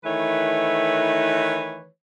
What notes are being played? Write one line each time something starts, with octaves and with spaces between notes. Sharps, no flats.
D#3 E3 A3 E4 B4 C#5